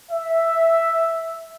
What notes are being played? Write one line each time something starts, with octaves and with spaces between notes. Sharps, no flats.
E5